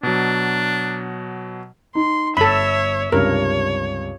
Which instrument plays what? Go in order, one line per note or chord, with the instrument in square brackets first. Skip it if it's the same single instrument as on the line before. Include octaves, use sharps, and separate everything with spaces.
[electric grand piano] B2 F#3 [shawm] D4
[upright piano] D#4 [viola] C6
[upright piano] G1 [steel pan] A4 B5 [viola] C#5 E5
[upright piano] C#2 G2 C3 [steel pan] A#4 [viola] C#5